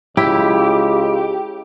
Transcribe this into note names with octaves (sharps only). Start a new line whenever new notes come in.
C#2 E4 G4